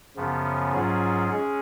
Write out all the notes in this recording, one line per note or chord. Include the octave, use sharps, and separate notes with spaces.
F#2 C#3 F3 B3
G#2 F#3 C#4 F4 G#4
G#3 C#4 G#4